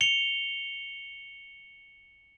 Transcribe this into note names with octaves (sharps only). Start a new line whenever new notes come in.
C#7 F7 G7